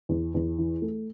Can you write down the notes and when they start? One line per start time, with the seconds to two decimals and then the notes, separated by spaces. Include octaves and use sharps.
0.09 E2
0.34 E2
0.58 E3
0.82 A3